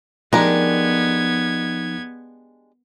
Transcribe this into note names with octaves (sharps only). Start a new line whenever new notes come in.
F3 G#3 B3 D4 D#4 G4 A#4 G#6